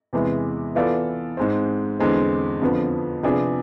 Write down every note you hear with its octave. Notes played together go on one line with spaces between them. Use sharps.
E2 C3 E3 G#3 B3
E3 B3 F4 A4 D5
G#2 G#3 C4
E2 D3 G#3 C4
F2 D3 F3 B3
C3 F3 B3 D4 G#4